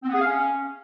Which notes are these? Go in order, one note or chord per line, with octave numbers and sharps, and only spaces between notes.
C4
B3
G#4
F5
C#4